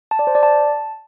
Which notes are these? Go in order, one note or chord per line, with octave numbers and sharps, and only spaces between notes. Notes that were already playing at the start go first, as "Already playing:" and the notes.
A5
D5
C5
D5
A5